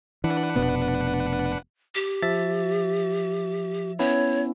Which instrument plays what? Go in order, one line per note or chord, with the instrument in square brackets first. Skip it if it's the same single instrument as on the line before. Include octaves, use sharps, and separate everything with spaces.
[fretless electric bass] E3 [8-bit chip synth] D4 B4 F#5
[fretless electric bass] F1 B2 B3
[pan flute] G4
[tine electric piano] F3 E5 A6
[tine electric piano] B3 C#4 E4 [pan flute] C#5